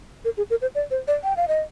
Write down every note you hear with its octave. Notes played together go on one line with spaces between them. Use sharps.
A#4
G#4
A#4
C5
D5
C5
D5
G5
F5
D#5